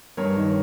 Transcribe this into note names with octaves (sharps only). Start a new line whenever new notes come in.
G2 A#4 C#5
D#3